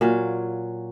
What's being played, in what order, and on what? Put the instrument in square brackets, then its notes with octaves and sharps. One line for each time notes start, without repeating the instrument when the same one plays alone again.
[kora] A#2 F#3 F5